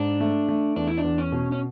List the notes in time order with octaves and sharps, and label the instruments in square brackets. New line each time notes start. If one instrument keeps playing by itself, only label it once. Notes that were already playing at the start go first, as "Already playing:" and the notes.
Already playing: [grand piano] G#2 [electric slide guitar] D4
[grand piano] A3
A3
[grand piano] E2 [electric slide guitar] D4
[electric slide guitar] E4
D4
[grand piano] E2
[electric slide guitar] C#4
[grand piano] B2
[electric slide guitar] C#4